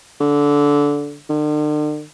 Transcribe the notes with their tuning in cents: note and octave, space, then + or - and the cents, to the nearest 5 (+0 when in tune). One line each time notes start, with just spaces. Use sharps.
D3 -15
D3 +45